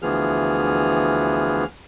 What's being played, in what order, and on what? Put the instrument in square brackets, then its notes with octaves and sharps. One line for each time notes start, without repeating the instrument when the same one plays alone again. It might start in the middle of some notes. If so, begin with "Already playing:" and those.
[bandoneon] D2 E3 F3 B3 G#4 F6